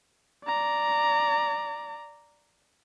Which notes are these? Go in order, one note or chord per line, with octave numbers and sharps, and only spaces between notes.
D5 A#5